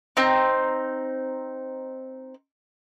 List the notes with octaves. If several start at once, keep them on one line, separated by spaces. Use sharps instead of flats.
C4 D#4